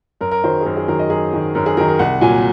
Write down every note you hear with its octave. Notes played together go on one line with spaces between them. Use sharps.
F#2 A#4
A#4
D#3 F#3 C5
G#4
F#2 A#4
G#4
D#3 F#3 A#4
D#5
F#2 G#4
D#3 F#3
F#2 A#4
G#4
D#3 F#3 A#4
A#4
C2 F#5
A#2 F#3 G#5